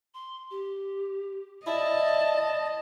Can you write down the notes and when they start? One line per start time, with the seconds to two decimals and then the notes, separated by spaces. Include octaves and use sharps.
0.14 C6
0.51 G4
1.67 E4 D5 D#5 A5